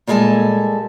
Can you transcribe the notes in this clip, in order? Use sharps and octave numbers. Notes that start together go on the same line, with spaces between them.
A#2 G3 G#3 A4 G#5 A5